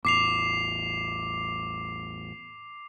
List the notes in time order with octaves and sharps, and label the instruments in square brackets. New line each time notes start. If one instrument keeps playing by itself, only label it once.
[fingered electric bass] A1 E2 [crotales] D6 C7 F7